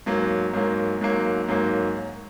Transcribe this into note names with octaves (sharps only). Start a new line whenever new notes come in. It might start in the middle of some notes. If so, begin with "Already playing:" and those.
G#2 F#3 A#3
G#2 F#3 A#3
G#2 F#3 A#3
G#2 F#3 A#3